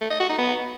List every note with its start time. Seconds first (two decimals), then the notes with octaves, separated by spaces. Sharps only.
0.01 A3
0.11 D#5
0.20 F#4
0.29 D#4
0.39 B3